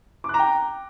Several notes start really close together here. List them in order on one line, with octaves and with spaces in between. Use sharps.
D6 F#6 A#5 G5